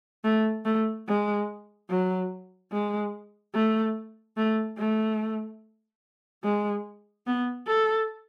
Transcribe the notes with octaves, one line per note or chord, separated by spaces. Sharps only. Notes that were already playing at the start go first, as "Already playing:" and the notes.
A3
A3
G#3
F#3
G#3
A3
A3
A3
G#3
B3
A4